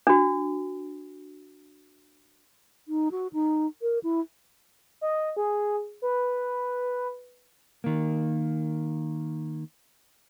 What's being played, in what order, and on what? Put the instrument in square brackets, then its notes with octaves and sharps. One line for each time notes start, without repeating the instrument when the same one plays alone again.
[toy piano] D4 F#4
[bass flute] D#4
F#4
D#4
A#4
E4
[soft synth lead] D#5
G#4
B4
[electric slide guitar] D#3 A#3